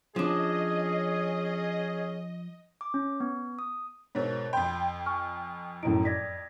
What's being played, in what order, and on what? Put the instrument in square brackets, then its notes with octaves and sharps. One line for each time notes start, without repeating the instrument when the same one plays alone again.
[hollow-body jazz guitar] F3 D4 [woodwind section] C#4 G#4 [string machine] D#5
[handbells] D6
C#4
B3
D#6
[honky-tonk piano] G#2 B2 [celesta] A#4 C5 C#5
[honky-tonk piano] F2 G5 [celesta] B5 C6 G6
[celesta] G#5 C#6 F6
[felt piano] F#2 A2 D#4 [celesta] D7
[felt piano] D5 [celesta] G#6 A#6 B6